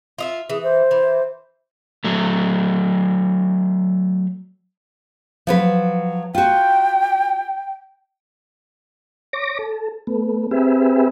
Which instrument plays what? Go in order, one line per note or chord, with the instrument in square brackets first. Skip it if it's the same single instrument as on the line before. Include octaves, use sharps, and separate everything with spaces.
[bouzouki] F4 D#5 E5
[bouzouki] E3 [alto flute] G#4
[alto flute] C5
[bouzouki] E3
[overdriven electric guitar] F#3 A3
[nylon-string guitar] F3 F#3 B4
[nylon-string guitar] F4 F#4 [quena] G5
[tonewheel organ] C#5 D6 A#6
A4
A3 B3
C4 G4 G#4 B4 E5